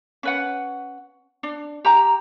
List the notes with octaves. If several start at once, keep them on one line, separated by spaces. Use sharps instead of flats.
C#4 B4 F#5
D4
G4 A#5